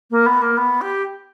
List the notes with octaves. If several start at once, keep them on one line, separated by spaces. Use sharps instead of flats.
A#3
B3
A#3
B3
G4